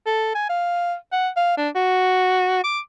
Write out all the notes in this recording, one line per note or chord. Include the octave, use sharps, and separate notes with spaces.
A4
G#5
F5
F#5
F5
D4
F#4
D6